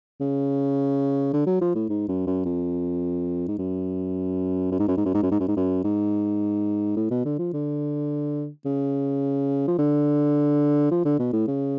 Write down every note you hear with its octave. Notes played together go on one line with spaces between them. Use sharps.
C#3
D3
F#3
F3
A2
G#2
F#2
F#2
F2
G#2
F#2
F#2
G#2
F#2
G#2
F#2
G#2
F#2
G#2
F#2
G#2
F#2
G#2
A2
B2
D3
F3
D3
C#3
F3
D3
F3
D3
B2
A2
C#3